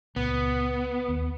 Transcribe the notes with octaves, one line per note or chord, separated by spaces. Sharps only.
C#2 A#2 B3
D#2